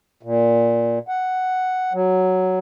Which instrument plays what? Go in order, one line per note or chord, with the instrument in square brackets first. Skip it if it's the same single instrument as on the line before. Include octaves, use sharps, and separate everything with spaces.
[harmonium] A#2
F#5
F#3